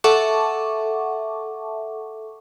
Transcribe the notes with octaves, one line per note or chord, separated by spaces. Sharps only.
A4 E5 F#5 A5 C#6 D6